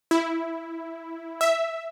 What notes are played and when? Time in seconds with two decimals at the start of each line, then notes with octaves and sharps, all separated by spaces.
0.11 E4
1.41 E5